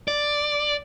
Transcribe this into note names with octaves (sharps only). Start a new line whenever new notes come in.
D5